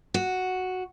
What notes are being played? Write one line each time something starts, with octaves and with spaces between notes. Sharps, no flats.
F#4